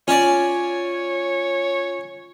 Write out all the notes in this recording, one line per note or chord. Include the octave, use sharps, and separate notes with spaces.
C#4 F4 C#5 D5